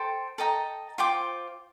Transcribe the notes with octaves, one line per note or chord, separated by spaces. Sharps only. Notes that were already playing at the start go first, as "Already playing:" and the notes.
Already playing: A4 C5 G5
A4 D#5 G5 A#5
F4 C5 G5 D6